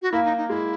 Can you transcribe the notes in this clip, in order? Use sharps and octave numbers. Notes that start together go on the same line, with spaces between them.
F#4
A#3 E4
D#4
D#4
G#3 E4